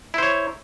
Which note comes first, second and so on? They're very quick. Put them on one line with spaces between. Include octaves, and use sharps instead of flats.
E4 C5 C#5